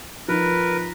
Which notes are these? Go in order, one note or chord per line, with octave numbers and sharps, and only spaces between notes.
F3 D#4 A#4 B4